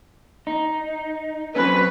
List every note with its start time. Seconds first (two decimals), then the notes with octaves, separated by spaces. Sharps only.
0.47 D#4
1.56 F#3 C4 C#4 B4